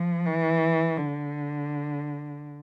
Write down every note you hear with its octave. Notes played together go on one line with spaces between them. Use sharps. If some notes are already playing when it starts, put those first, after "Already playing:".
Already playing: F3
E3
D3